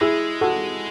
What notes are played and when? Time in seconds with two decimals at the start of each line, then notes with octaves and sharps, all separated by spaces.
0.01 G#3 E4 G#4
0.41 F#4 A4